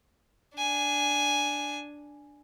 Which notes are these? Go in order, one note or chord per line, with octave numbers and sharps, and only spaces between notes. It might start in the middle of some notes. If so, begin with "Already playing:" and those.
D4 G#5